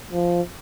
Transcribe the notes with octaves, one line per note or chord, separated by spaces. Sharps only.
F3